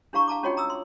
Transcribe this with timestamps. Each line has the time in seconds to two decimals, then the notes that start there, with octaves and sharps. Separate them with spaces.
0.13 D4 E4 G4 F5 A#5 C#6
0.28 F5 A5 A#5 D6
0.43 C#4 F4 F#4 C#5 D#5 G5
0.57 A#5 D#6 E6
0.70 C6